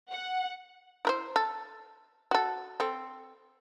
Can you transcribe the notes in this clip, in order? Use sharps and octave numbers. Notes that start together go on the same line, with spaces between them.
F#5
E4 A#4 C5
A4
F#4 A4
C4 A4